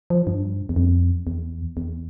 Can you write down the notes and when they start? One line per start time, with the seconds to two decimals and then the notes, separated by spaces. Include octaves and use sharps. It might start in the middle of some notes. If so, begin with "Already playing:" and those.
0.10 F3
0.27 G2
0.69 E2
0.76 F2
1.27 E2
1.77 E2